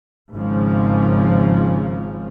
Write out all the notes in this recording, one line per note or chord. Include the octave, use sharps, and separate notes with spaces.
G#1 G#2 C#3 F3